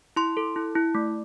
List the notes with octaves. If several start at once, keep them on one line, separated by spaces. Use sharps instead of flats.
E4 C6
A4
E4
E4
A3